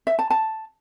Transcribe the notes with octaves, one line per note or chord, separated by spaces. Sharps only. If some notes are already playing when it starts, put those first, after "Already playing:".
E5
A5
A5